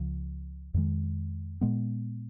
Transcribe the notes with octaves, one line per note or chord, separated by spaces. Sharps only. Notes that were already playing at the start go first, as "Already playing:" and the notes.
Already playing: C#2 C#3 F3
F2 D#3 G#3
A#2 G#3 B3